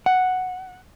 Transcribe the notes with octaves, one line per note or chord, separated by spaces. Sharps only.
F#5